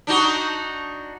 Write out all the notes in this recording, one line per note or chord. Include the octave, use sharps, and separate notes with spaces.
D4 D#4 F#4